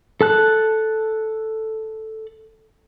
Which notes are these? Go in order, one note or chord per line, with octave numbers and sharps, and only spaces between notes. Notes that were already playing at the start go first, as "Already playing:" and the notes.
A4 A5 F#6